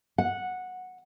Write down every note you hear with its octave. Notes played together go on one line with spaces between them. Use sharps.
F#5